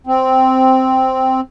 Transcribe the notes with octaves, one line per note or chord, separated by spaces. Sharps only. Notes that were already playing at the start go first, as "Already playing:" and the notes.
C4